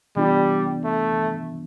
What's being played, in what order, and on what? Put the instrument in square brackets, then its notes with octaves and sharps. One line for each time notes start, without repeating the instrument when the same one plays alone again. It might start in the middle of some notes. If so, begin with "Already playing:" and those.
[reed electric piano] C3 E3 B3 D4 F4 [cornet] G3
[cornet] A3